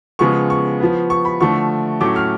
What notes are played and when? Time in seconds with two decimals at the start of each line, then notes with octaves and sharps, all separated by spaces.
0.19 C#3 F3 G#3 B3 C#6
0.50 C#6
0.80 F3 B3
1.10 C#6
1.25 B5
1.40 D3 F3 A3 C#6
2.01 A2 F#3 A3 C#4 D6
2.16 F6